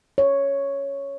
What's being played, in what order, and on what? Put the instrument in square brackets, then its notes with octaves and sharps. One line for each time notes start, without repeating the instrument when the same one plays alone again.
[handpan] C#5